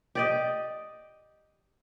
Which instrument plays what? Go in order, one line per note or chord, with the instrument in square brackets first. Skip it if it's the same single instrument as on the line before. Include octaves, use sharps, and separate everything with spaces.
[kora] G4 D5 D#5